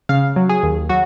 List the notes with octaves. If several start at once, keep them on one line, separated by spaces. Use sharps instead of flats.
C#3 F5
F#3
G#4
D#2
F#3 F#4